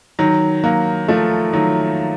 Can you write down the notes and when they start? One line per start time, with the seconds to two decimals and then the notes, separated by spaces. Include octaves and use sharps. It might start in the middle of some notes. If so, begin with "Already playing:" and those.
0.19 D#3 F#3
0.64 F#3 A#3
1.08 F3 A3
1.53 D#3 F#3